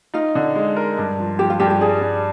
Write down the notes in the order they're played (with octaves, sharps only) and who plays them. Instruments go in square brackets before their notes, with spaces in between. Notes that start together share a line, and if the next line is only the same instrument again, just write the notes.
[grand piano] D#4 [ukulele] F4
[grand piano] D3
G#3
A#4
G2
F3
[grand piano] F3 [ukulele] G4
[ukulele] F4
[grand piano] G2 [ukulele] G4
[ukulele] G4
[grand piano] G3 [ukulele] G#4
[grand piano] G3